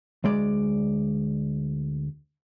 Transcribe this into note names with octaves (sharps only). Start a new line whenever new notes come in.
D2 G#3 D5